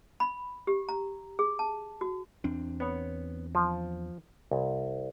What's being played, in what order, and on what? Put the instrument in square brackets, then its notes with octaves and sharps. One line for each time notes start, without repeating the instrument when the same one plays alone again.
[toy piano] B5
G4
A#5
G#4
A5
F#4
[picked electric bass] E2 C4 D4
[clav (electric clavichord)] B3 C#5
F3
C2